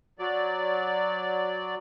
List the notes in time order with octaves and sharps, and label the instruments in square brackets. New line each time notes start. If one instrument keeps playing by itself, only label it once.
[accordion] F#3 D5